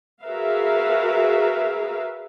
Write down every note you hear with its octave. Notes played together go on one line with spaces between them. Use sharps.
F#4 G#4 A#4 B4 E5 F5